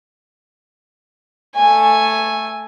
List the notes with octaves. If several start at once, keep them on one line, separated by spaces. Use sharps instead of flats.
A3 G#5